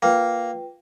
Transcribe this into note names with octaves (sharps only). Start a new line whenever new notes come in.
A#3 F4 B4 G5